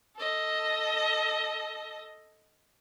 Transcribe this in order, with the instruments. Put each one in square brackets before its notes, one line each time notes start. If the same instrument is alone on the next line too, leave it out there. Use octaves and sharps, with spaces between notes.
[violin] A4 D#5